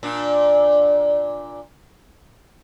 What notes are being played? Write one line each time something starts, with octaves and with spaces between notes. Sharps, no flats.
A#2 D4